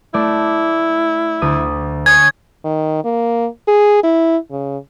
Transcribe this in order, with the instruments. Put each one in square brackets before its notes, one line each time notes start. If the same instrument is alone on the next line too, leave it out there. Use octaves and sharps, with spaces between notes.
[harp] A3 D5 [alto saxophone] E4
[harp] D2 D#6
[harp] C#5 D#6 F#6 [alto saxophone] G#5 [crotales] G#6
[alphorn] D#3
A#3
G#4
E4
C#3